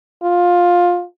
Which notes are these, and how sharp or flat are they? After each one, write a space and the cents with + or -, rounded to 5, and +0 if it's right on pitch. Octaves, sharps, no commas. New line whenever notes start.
F4 +15